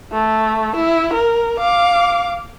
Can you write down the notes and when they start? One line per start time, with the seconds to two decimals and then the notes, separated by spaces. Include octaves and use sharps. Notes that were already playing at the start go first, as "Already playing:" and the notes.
0.13 A3
0.76 E4
1.13 A#4
1.59 F5 D6